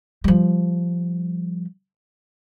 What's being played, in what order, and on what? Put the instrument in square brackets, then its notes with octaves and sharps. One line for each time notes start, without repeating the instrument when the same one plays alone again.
[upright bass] F3 G3